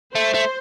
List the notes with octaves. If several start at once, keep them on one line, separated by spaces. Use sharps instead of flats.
A3 C5
A3